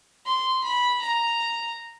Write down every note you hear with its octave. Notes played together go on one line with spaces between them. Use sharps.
C6
B5
A#5